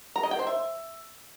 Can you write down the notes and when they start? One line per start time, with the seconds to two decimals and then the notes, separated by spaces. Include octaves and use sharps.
0.16 A#5
0.23 D#5
0.31 G5
0.39 C5
0.47 E5